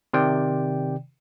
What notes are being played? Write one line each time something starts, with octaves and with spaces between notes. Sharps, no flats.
C3 D#3 D5 G5